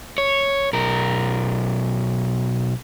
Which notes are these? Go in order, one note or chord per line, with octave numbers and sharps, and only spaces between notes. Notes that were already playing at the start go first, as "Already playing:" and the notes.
C#5
B1 A#4